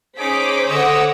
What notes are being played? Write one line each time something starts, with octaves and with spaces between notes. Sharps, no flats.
C#4 D#4 G#4 C5 D6 B6
D3 C#5 D#5 F#5 D6 E6